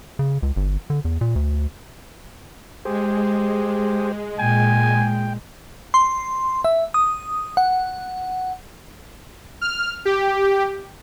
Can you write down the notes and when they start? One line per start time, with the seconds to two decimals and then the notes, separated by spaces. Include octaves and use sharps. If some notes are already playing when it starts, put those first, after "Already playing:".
0.19 C#3
0.43 C#2
0.56 G1
0.90 D3
1.05 E2
1.21 A#2
1.36 D2
2.85 G#3 G4 G#4 C5
4.39 A#2 G5 G#5
5.94 C6
6.64 E5
6.94 D#6
7.57 F#5
9.61 F6
10.05 G4